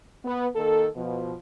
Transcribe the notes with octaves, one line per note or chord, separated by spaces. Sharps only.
B3
D#3 A#3 A4
B2 F3